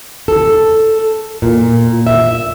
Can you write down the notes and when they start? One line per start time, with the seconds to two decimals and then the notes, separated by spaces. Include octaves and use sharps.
0.28 A4
1.42 A#2
2.07 E5